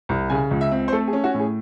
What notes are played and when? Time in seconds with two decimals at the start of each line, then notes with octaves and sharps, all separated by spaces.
0.09 C2
0.30 C#3 G#5
0.51 C#2
0.61 E5
0.72 C4
0.88 C5
0.92 A3 A4
1.08 G#4
1.13 C#4
1.24 F#4
1.34 A2
1.40 G#4